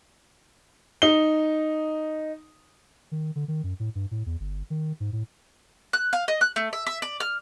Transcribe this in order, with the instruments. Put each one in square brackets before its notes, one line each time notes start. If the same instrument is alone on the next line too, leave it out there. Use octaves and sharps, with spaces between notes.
[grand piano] D#4 G7
[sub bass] D#3
D3
D#3
F#2
A2
G2
A2
E2
G1
D#3
G#2
A2
[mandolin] F#6
F5
D#5
F#6
A3
E5
E5
D5
F6